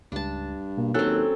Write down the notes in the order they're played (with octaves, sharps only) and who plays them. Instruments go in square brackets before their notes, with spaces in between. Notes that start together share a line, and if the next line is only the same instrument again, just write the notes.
[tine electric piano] C#2 [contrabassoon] G2 [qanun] D4 A5
[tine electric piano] B2 A#3
[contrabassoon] D#2 [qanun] F#3 C4 [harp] C#4 A4 [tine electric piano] F#6